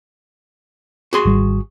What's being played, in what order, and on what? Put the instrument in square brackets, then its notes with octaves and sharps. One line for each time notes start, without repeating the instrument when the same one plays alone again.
[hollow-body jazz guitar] F#4 G#4 C6
[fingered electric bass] G#1 G3